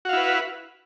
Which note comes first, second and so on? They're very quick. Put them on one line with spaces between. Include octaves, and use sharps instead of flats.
F#4 F5 E4 B4